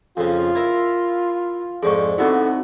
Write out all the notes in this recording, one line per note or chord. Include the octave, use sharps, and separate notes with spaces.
F2 C#3 F4
E4 A#4 E5
F2 G#2 G#4 D5 C#6
D3 B3 C4 D#4 E4 F#4 E5